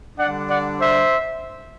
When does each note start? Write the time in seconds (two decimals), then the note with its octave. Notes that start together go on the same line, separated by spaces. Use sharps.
0.18 D3 G3 D4 D5 F#5
0.48 D5 F#5
0.79 C5 E5